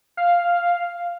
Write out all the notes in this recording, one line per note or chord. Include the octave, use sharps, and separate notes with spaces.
F5